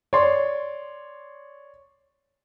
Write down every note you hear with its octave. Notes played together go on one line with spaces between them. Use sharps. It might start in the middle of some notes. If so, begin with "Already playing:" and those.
C#5 D5 C6